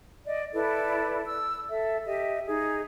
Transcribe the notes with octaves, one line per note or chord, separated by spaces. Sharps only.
D5 D#5
E4 A4 B4 D5
E6
A4 E5
G4 D#5 E5
D#4 G#4